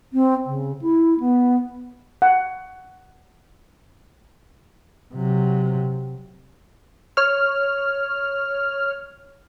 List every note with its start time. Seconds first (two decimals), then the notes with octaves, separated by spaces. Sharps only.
0.13 C4
0.46 C#3
0.81 E4
1.20 B3
2.22 F#5
5.14 C3 F#3
7.17 C#5 F6